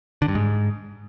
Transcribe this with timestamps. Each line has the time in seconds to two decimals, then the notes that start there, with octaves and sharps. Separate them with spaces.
0.22 D3
0.28 G2
0.35 G#2